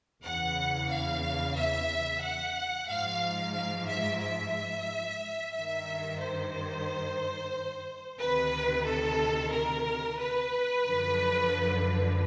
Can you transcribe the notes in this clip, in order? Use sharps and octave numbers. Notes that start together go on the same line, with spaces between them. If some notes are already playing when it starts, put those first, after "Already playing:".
E2 C#3 E3 F#5
F5
E5
F#5
G#2 F3 F5
F5
E5
E5
G2 D#3 E5
C5
D2 C3 D#3 B4
A4
A#4
B4
F#2 D3 F3